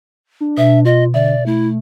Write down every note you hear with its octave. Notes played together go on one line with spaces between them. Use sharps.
D4
B2 E5
F4 D#5
D3 D5 E5
A3 E4